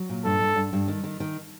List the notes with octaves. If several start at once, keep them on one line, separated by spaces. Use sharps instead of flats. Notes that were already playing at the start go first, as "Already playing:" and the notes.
Already playing: F#3
A#2
G2 A4
G2
G2
G2
D#3
D#3
D#3